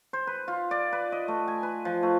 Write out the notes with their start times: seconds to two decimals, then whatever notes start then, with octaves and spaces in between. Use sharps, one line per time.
0.13 C5
0.27 B4
0.48 F4
0.71 D5
0.93 B4
1.12 D#5
1.28 A3
1.48 G#5
1.63 B4
1.85 F3
2.03 A3